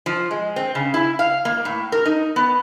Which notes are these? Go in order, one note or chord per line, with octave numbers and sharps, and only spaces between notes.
F3
G#3
C4
C#3
E4
F5
A#3
A2
A#4
D#4
B3